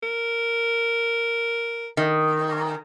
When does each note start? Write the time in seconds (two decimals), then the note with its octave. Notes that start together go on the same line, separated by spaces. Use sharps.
0.03 A#4
1.97 D#3